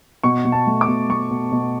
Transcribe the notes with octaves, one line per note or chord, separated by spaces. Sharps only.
B2 C#6
B2
A5
A3
D6
B2
A3 C#6
B2
B2